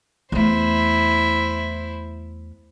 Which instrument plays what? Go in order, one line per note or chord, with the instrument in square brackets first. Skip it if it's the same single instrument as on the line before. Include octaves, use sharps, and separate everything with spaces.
[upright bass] E2 A3 [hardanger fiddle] E4 C5